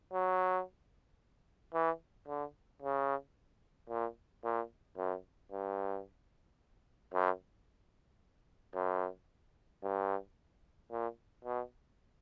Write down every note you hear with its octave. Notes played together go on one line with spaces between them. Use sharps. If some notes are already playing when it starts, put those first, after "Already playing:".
F#3
E3
D3
C#3
A#2
A#2
F#2
G2
F#2
F#2
G2
A#2
B2